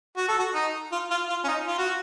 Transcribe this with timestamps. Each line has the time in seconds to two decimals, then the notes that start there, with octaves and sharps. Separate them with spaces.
0.17 F#4
0.28 A4
0.39 F#4
0.54 D#4
0.92 F4
1.10 F4
1.29 F4
1.44 C#4
1.48 D#4
1.67 F4
1.78 F#4